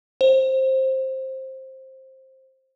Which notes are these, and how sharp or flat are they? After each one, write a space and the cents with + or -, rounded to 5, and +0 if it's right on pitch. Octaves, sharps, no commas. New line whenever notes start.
C5 +15